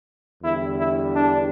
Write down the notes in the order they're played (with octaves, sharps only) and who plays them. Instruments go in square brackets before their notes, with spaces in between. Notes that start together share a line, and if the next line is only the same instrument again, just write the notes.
[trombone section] E2 D3 G3 E4
E4
D4